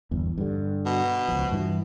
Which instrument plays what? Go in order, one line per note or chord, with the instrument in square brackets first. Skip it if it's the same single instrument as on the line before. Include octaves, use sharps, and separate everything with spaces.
[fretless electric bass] G1 E2
G2 D3
[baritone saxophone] B2
[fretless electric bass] C#2 F3
G2 E3